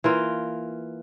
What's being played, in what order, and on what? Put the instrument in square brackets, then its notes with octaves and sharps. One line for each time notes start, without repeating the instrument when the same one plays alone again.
[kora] E3 A#3 F4